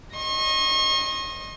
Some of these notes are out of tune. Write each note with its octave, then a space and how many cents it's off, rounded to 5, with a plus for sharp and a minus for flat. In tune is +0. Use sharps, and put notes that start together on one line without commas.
D#5 +0 C#6 -45